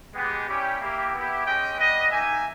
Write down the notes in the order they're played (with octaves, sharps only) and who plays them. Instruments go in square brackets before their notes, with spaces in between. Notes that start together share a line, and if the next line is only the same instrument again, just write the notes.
[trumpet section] G#3 B3 G4
G3 C#4 E4 G4
A#3 E4 G4
B3 E4 G4
G#3 C#4 G4 D#5 G5
G3 B3 G4 B4 D#5
A#3 D#4 G4 E5 G#5